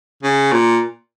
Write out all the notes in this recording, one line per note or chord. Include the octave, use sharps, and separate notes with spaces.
C#3
A#2